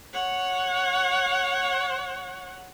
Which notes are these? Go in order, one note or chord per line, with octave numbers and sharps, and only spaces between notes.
C#5 F#5